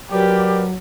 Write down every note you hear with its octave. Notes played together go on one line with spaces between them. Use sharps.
F#3 G4 A#4 B4 D5